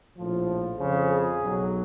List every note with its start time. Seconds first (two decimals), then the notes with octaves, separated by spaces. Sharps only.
0.18 A#1 A2 F3
0.79 F2 C#3 F3
1.10 G#4
1.40 B1 B2 F#3